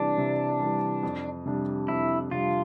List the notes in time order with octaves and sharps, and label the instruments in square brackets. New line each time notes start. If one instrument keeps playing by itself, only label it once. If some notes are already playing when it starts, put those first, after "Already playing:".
Already playing: [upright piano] C3 E3 G3 [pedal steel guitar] D4
[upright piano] C3
E3 G3
F2
C3 G3 D4
[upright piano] F2 [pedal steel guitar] E4
[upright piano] C3 G3 D4 [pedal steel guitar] F4